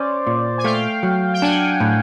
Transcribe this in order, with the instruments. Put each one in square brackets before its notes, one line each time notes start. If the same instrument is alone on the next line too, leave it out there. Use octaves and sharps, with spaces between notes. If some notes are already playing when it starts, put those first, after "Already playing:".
Already playing: [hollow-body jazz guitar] C#4 [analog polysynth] C5 D5
[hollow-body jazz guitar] A#2
[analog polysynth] G#5
[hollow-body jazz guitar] A3 [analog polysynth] F5 G5
[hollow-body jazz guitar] F#3
[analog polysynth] G5
[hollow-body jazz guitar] D4 [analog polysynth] F#5 G#5
[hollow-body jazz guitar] A2